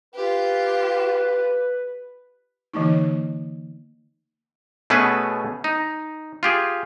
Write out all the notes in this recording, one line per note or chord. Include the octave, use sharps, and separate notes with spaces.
F4 G4 B4
D3 E3 A#3 D#4
B2 A3 C#4 G#4 B4
D#4
F4 G4 G#4